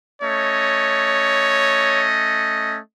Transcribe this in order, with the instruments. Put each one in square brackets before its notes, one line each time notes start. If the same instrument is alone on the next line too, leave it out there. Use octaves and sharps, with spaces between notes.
[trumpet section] A3 C#4 D#5 [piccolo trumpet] C#5